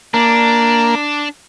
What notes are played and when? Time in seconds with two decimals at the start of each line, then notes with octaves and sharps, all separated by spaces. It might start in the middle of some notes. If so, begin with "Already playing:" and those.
0.14 A#3 D4